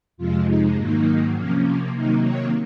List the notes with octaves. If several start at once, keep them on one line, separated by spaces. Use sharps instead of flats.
F2 C3 F3 G#3 F4
D#4
G#2 D#3 F#3 A#3 D#4
C3 F3 A#3 C#4
C3 D#3 F#3 A#3 D#4
C#5